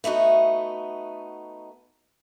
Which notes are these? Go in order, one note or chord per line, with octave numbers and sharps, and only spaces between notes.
A3 B3 D#4 F#4